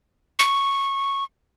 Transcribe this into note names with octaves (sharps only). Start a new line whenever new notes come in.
C#6